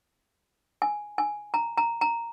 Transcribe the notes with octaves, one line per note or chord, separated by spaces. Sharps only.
G#5
G#5
A#5
A#5
A#5